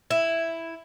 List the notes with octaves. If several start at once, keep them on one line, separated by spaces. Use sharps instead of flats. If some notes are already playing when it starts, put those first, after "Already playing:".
E4